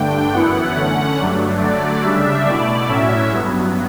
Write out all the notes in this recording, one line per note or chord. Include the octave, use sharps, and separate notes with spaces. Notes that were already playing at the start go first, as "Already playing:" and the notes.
Already playing: G2 D3 A3 D4 G5
F#2 E3 B3 E4 F#5
D3 A3 C#4 F#5
G2 F#3 A3 D4
D3 F#3 A3 D5
C#3 G3 D4 E5
B2 A3 E4 D5
A2 F#3 C#4 E4 E5
G2 F#3 B3